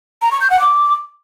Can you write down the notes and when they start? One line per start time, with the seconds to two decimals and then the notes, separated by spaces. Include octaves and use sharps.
0.22 A#5
0.31 C#6
0.41 G6
0.50 F#5
0.60 D6